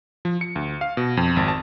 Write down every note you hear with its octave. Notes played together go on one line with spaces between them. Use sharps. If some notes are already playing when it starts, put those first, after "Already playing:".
F3
C#7
D2
F5
B2
F2
G#1
A5